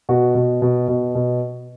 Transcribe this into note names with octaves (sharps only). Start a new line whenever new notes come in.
B2 F#4
B2
B2
B2
B2